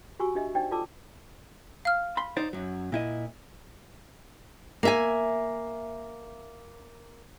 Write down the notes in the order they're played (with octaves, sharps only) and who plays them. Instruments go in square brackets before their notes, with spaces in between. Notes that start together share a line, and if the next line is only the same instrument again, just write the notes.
[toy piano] F#4 G4 G#5 C#6 E6
D4 G4 D#5 E5
D4 D#4 C5 D5 G5
F4 A4 D5 A5 D6 E6
[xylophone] F5 F6
[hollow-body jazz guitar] B5 C6
D#4 C5 D5
F#2 F#3
A#2 E4 D#5
[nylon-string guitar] A#3 E5 G#5